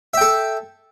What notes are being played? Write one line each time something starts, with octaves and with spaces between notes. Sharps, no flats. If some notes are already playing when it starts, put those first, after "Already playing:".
A4 E5 G5